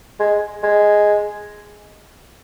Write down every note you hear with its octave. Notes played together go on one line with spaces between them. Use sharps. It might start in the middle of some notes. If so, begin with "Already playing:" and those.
G#3
G#3